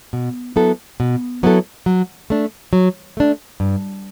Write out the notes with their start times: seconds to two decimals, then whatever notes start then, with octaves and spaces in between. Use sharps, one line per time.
0.13 B2
0.56 F#3 B3 E4 A4
1.00 B2
1.43 F#3 B3 E4 A4
1.86 F#3
2.30 A3 D4
2.73 F#3
3.17 A3 D4
3.60 G2